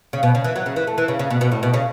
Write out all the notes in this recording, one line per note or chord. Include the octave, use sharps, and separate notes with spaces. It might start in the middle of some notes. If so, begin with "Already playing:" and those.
C#3
B2
C#3
E3
F#3
C#3
E3
A3
E3
C#3
C#3
B2
B2
A2
B2
C#3